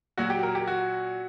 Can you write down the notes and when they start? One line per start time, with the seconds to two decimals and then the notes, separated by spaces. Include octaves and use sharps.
0.18 A#2 F#3 F#4
0.30 G4
0.43 A#4
0.55 G4
0.67 F#4